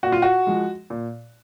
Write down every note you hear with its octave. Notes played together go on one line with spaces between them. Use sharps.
A#2 F#4
F4
F#4
F3 G#3
A#2